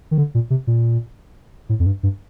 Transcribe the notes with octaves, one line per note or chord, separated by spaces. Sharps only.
D#3
D3
A#2
C3
A#2
A2
F2
G2
G2